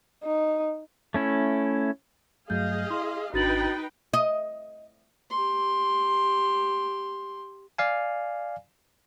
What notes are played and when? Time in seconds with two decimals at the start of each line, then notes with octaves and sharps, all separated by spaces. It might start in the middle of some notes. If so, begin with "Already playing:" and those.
0.24 D#4
1.14 A3 C#4 E4
2.50 G2 F#3 A3 G#4 D#5 F5 G6
2.90 E4 C6
3.34 G#1 D4 D#4 F#4 B4 G5 A6 F#7
4.13 D#5
5.30 G4 C6
7.78 D5 F5 G#5